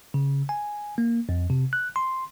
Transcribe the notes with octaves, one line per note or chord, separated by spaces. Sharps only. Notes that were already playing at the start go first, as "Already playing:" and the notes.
C#3
G#5
A#3
F2
C3
F#6
C6